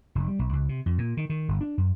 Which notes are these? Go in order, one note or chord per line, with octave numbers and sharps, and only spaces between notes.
F1
G3
B1
C#2
C3
F2
A#2
D#3
D#3
G1
D4
F#2